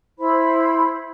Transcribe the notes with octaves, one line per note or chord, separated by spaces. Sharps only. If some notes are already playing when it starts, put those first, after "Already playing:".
E4 C5 B5